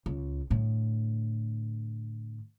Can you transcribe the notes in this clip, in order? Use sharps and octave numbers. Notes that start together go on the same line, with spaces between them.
C#2
A2 D3